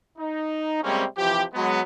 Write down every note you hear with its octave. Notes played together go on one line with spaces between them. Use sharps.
D#4
C3 G3 G#3 A#3 C4 C#4
C3 E3 F3 G4
F#3 G#3 B3